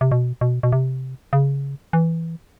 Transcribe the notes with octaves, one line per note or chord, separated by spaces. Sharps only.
C3
B2
B2
B2
C3
C#3
E3